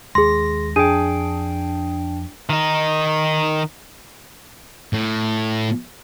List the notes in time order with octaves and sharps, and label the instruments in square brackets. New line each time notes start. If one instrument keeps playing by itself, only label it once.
[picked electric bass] D#2 G#3 [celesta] G#4 C6 [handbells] A#6
[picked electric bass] F2 [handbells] D4 G5 [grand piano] G#4 [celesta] D#7
[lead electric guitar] D#3 D#4
[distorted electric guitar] A2